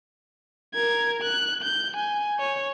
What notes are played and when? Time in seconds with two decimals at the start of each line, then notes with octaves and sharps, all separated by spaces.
0.74 A#4 G#6
1.22 F#6
1.63 G6
1.97 G#5
2.39 C#5